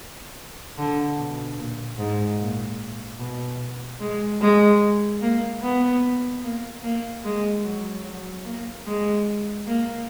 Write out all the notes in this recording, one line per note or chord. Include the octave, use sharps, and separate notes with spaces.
D3
B2
A#2
G#2
A#2
B2
G#3
G#3
A#3
B3
A#3
A#3
G#3
F#3
F#3
A#3
G#3
A#3